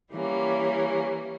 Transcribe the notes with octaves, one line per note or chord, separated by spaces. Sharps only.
E3 G3 A#3 C#4